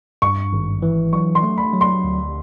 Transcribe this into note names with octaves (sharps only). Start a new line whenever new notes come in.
G2 C#6
G#1
E3
F#3 C#6
C6
A3
B5
F#3
C6
D2